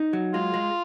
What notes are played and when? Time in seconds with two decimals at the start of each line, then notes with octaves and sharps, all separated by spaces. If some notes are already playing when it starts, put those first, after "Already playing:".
Already playing: D#4
0.13 F#3
0.33 G#3 F4
0.54 G#3